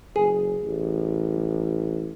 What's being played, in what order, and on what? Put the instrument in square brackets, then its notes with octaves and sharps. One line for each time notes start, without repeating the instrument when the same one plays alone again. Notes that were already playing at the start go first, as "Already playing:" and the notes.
[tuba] F#1 [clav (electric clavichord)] G#4
[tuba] A1